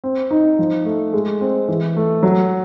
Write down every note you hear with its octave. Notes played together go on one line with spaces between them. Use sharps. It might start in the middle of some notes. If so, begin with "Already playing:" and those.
C4
D#4
F3
A3
G#3
C4
E3
A3
F#3